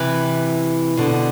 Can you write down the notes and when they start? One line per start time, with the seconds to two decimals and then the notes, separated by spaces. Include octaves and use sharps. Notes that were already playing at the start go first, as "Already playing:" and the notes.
Already playing: C3 E3
0.97 B2 D3